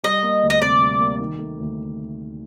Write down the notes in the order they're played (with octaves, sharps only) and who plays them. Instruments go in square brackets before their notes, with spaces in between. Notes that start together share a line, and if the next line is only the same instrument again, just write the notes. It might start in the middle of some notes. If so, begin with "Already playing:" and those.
[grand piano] G3 [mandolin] D#5
[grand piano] A#3
D2
[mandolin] D#5
[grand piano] C3 [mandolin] D5
[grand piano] G3
A#3
D#3
A3
D2